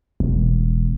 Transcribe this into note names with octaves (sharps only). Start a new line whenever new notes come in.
E1